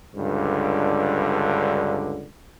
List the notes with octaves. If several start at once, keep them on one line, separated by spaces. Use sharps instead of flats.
C#2 G2 D3